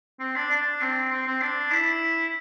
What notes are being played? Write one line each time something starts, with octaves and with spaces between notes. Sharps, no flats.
C4
D4
D4
C4
C4
C4
D4
E4